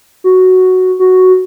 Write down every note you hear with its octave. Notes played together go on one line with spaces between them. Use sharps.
F#4
F#4